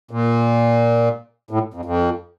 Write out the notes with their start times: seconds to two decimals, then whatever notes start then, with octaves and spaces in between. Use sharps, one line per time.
0.11 A#2
1.51 A2
1.74 F2
1.85 F2